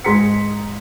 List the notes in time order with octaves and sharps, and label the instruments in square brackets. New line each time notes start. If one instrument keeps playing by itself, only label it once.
[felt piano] G#2 G#4 A#5 C6 B6 C#7